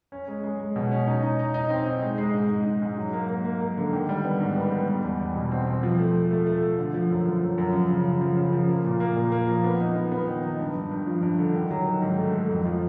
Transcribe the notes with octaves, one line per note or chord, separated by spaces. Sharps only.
C#4
G#3
G#3
G#3
B2
C#4
D#4
D#4
D#4
D#4
C4
D#4
G#3
G#3
G#2
G#3
G#2
G#2
F#3
A#3
A#3
A#3
A#3
D3
D#3
G3
B3
G#2
B3
B3
G3
E2
E2
B2
C4
C4
F3
A3
A3
A3
A3
A3
D3
F3
F#2
F3
F#2
F#2
F3
C#3
C#3
F3
C#3
F3
A#3
A#2
A#3
A#2
A#3
F3
B3
D#4
B3
B3
D#3
D#4
G2
G2
G2
F3
G2
D3
D#3
F#3
D#3
G#2
A3
A3
F2
F3